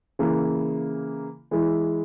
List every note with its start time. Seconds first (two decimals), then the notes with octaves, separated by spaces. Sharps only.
0.19 C#3 E3 A#3
1.51 E3 G#3 E4